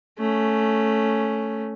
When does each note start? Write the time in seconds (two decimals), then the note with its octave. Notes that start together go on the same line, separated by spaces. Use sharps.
0.18 A3 C#4